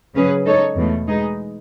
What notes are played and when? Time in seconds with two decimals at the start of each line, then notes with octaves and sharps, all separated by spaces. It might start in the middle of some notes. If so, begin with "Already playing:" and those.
0.13 C#3 F#3 C#4 G#4 B4
0.45 G#3 D#4 A4 C#5
0.76 E2 B2 A3
1.08 G#3 D#4 G#4 B4